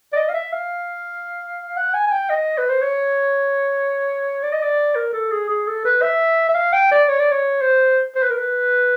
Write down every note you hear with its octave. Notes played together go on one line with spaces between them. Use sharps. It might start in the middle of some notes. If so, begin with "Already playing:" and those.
D5
D#5
F5
E5
F5
F#5
G#5
G#5
G5
D#5
B4
C5
C#5
D5
D#5
D5
A#4
A4
G#4
G#4
A4
B4
E5
E5
F5
G5
D5
C#5
D5
C#5
C5
C5
B4
A#4
B4